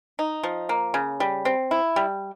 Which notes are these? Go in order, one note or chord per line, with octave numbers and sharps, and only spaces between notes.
D#4
F3
A#3
C#3
G3
C4
E4
G3